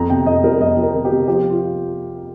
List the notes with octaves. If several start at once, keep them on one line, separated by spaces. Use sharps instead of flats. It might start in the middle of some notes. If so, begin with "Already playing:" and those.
Already playing: F2 A#5
C3 G5
F2 D#5
G3 A#4
F2 D#5
G3
A#4
C3
G4
C3
F3 G4
F4